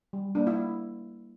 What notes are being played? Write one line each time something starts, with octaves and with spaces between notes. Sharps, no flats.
G3
A#3 D4
E4